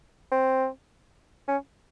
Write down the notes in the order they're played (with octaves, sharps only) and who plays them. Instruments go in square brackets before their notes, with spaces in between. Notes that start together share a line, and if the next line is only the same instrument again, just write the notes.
[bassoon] C4
C#4